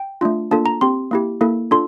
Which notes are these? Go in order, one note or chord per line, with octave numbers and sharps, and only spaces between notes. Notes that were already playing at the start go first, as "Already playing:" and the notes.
Already playing: G5
A3 D4 F4
A#3 D4 F4 A4 A5
A#5
C4 G4 C6
A#3 E4 G4
A#3 E4 A4
D4 F4 A4 C6